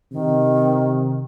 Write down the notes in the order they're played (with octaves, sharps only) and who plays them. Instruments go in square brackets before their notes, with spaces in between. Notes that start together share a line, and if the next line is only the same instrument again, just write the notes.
[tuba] C3 [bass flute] D#3